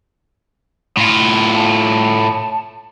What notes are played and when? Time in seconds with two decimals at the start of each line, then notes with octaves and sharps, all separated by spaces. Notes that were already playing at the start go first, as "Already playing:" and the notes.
0.97 A2 F4
1.55 A5